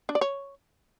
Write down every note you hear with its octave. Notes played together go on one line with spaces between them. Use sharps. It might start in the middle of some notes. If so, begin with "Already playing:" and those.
D4
D5
C#5